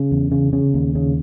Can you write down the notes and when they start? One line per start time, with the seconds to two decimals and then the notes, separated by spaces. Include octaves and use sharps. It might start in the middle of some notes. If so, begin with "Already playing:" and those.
Already playing: C#3
0.11 E2
0.32 C#3
0.53 C#3
0.74 D#2
0.95 C#3